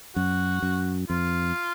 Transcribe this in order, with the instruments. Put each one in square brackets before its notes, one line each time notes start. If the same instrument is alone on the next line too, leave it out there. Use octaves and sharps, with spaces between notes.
[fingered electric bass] F#2 [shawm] F#4
[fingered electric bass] F#2
[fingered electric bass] F2 [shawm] F4